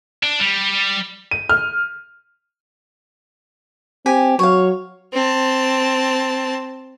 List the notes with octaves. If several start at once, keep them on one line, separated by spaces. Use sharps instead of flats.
D4
G3
D#7
F6
C4 G4 G#5
F#3 C#5 F5
C4 A5